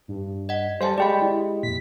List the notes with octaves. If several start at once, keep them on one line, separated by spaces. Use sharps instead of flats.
G2
D#5 F#5
G3 A4 C5 F5 G#5 A5
G#3 G4 G#4 D5 F5 G5 B5
E4
F2 A#2 B6